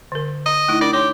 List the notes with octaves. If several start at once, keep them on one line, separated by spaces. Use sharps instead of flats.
D3 A#4
D#5
A3 D#4 E4
D4 A#4 D5
G4 C#5 C6